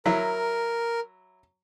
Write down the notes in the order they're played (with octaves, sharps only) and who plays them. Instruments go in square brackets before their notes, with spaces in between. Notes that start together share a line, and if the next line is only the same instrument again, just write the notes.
[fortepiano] F#3 E4 [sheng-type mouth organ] A#4